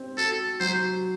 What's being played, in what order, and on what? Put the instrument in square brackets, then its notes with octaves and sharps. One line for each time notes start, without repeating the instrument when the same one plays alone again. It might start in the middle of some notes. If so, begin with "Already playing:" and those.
Already playing: [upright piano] C4
[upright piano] F#4 [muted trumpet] A4
[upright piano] F#3 [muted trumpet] C5